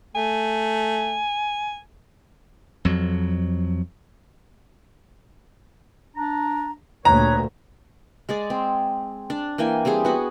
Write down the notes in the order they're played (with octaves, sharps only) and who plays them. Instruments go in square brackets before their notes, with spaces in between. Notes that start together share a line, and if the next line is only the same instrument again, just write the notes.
[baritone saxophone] A3 [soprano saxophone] G#5
[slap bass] F2 F#3
[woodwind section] D4 A#5
[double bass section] D2 A#2 [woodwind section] B4 C#5 [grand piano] A#5
[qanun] G#3 G#4 D5
C4
D4
E3 A#3 G5 G#5
G3 C4 G4 G#4
B3 F#4